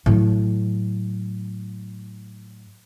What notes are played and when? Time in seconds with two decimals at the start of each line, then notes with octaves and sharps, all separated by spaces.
0.06 A2 F#3